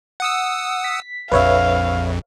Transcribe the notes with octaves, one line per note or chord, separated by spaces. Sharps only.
F#5 D#6 E6
B6
A#1 F2 B4 C#5 E5 F5